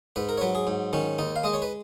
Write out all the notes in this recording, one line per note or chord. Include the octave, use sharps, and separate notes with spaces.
G#2 B4
A#4
C#5
F#3 B4
G#4
G#2
D#3 C#4
D#2 D#4
F5
G#3 D#5
C#5
B4